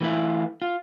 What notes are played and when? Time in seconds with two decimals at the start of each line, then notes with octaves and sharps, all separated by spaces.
0.01 E3 A3 C4 E4 F4
0.62 F4